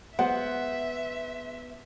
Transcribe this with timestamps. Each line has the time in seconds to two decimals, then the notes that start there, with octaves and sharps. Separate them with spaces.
0.19 G#3 B3 C5 E5 F#5